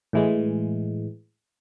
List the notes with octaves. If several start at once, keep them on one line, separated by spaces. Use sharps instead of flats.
A2 E3 G#3